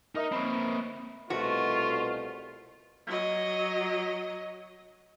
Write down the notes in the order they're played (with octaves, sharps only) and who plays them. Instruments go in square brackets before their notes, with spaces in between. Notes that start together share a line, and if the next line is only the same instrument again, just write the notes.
[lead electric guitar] D#4 [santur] A#4 D#5 E5
[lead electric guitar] A#3 C4 [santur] C#5 B5
[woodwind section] C2 B2 [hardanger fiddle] A3 [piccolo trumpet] F4 [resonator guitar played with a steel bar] F#4
[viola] F#3 D#5